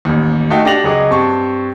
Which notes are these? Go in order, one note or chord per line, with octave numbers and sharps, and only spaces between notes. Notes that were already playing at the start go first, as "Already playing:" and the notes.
A1 D#2
A3 D#4 F#4 F5 G5
D4 G4 D6 A#6 F7 F#7
C#2 F#3 G#4 D#5 D6
G2 C4 A5 C#6